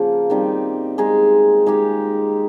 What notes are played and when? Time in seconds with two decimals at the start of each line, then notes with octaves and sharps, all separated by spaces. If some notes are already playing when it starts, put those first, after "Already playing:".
Already playing: C#3 F3 A#3
0.30 D#3 G3 C4 D#4
0.98 G#3 D#4 G#4
1.66 G#3 D#4 G4